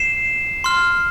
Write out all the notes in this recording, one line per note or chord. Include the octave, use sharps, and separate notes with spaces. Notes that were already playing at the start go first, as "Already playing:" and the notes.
Already playing: C7 E7
C6 F6